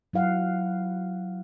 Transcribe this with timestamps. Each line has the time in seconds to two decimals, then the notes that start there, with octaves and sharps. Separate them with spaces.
0.13 F#3 E4 F5 F#5